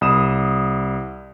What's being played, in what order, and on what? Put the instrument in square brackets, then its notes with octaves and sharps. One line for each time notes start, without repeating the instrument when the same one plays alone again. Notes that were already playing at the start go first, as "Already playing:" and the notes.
[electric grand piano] C2 B5 D#6 E7